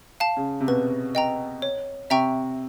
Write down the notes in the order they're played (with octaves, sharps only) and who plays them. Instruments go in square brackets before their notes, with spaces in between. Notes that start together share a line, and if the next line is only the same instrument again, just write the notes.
[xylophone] F5 A5
[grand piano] C#3
C3
[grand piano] B2 [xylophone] B4
[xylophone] D#5 G5 A#5
C#5
[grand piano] C3 [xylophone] E5 G5 A#5 C#6